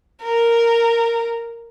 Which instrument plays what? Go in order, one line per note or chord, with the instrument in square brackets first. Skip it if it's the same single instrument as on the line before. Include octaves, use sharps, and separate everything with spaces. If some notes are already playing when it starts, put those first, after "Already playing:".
[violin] A#4